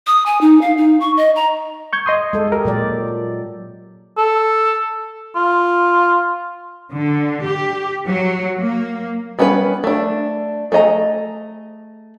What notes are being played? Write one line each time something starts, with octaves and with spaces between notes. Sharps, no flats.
D#6
G#5
D#4
F5
D#4
C#6
D#5
A#5
C#6 G6 G#6
D#5 C6 D#6
G#3 A4
G4 A#4
A#2 F#3 D5
A4
F4
D3
G4
F#3
A#3
G3 B3 C#4 F4 B4
A3 D4
A3 G#4 D#5 A#5